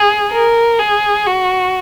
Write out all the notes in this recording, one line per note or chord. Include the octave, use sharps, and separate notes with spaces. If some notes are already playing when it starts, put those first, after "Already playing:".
Already playing: G#4
A#4
G#4
F#4